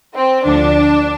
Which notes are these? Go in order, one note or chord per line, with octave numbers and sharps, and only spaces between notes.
C4
D2 D3 F3 D4